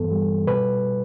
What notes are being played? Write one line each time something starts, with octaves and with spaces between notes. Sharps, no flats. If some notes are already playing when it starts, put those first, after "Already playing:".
Already playing: G2 E3 B3 A4
G3
B2 B4